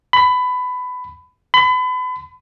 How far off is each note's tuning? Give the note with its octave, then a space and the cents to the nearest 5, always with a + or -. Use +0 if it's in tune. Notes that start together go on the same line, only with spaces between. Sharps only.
B5 +20
B5 +35